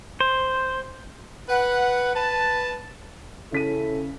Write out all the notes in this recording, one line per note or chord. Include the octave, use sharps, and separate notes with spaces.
C5
B4 F#5
B4 A5
C#3 C#4 E4 A4 B6 D#7